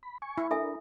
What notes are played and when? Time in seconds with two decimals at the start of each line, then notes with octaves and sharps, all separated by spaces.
0.03 B5
0.22 G#5 C#6
0.38 E4
0.51 D4 A4 A#4 E5 G#5